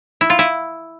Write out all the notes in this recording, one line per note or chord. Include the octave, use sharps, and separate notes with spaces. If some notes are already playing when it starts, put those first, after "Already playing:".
E4
F4
E4